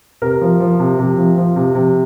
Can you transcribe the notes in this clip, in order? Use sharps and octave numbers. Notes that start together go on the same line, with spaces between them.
C3 A#4
F3
F3
C3
C3
F3
F3
C3
C3